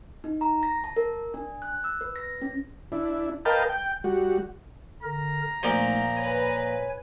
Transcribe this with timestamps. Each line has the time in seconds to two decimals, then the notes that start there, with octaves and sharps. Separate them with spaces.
0.24 D#4
0.41 A#5
0.63 A#6
0.84 A5
0.96 A#4
1.34 D4
1.62 F#6
1.84 E6
2.01 B4
2.16 A#6
2.42 C#4
2.92 D4 E4
3.45 A#4 B4 D#5 F5 G5 A5
3.69 G5
4.04 G3 F#4
5.03 D3 A#4 A#5
5.63 A#2 F3 A3 B3 D#4
6.17 B4 C#5 G#5